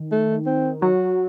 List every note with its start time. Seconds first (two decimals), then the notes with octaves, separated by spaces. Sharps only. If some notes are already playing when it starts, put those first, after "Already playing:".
Already playing: D#3
0.12 A3
0.46 C4
0.82 F#3 F#4